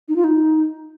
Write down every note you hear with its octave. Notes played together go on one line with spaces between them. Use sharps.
D#4
F4
D#4